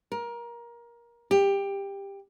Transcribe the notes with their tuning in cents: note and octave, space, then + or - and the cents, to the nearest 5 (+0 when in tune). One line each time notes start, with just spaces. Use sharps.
A#4 +20
G4 +15